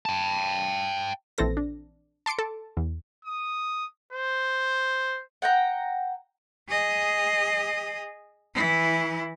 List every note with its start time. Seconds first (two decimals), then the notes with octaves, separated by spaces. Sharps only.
0.06 G5 A5
1.38 A#1 E3 C4 A4 A#6
1.57 D4
2.26 A5 C6 D6 C#7 D7
2.39 A4 A5
2.77 E2
3.25 D#6
4.13 C5
5.42 F#5 G5 A#5
6.68 G#4 D#5
8.54 E3 E4